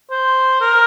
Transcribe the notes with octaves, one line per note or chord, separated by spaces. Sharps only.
C5
A#4